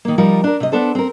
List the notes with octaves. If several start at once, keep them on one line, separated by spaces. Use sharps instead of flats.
D#3 A#3
F3 G3 D#4 F4 A#4
D4 A#4
C3 D#5
B3 D4 A4 C5
C4 A#4